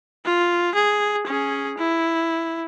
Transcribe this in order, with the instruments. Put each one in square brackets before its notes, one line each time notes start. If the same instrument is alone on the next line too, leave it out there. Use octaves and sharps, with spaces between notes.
[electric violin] F4
G#4
C#4 G#4
E4